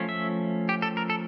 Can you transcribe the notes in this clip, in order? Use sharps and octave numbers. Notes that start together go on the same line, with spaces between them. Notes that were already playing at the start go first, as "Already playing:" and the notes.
Already playing: F3 A3 C#4
E5
G4
A4
A#4
A4